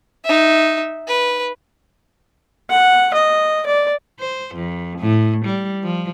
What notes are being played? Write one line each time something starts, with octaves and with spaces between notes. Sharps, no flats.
D#4 E5
B4
F#5
D#5
D5
C5
F2
A2
G3
F3